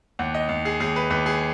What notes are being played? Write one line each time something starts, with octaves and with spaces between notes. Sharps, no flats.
D#2 F#5
D#5
D#2
G#4
D#2 G#4
B4
D#2 B4
G#4